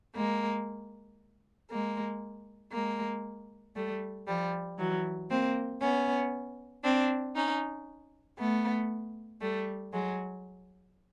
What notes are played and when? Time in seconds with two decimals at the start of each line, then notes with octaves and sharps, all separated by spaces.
0.15 G#3 A#3
1.70 G#3 A#3
2.72 G#3 A#3
3.75 G3 A3
4.27 F3 G3
4.78 E3 F#3
5.30 A#3 C4
5.81 B3 C#4
6.84 C4 D4
7.36 C#4 D#4
8.38 A3 B3
9.41 G3 A3
9.93 F#3 G#3